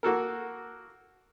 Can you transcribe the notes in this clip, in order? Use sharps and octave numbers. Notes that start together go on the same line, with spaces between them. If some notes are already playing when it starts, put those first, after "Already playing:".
A#3 F#4 A4 A#4